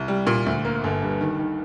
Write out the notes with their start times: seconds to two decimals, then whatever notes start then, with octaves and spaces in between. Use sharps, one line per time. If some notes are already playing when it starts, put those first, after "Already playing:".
Already playing: C2
0.08 G3
0.27 A#2
0.46 D2
0.65 A#3
0.84 G1
1.02 G2
1.21 D#3
1.39 D#3